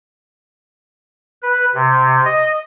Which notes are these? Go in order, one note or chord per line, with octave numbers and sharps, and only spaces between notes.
B4
C3
D#5